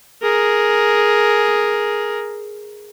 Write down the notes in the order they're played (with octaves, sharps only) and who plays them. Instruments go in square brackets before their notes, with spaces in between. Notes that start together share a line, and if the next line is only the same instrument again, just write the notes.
[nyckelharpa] G#4 A#4